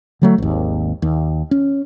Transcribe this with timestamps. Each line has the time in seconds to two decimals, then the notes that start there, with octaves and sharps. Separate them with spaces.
0.22 D3 F#3 A3
0.38 G#1 D#2
1.02 D#2
1.51 C#4